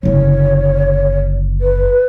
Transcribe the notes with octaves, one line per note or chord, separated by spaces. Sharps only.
F#1 D3 C#5
B4